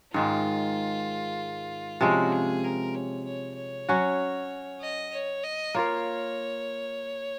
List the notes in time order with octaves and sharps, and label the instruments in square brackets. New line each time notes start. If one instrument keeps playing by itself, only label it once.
[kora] G#2 D#3 G#3 [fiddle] F4
[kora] C3 F3 G#3 C#4 [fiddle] F#4
[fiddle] G#4
A#4
C#5
C#5
C#5
[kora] F#3 C#4 F#4
[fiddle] D#5
C#5
D#5
[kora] A#3 F4 A#4 [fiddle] C#5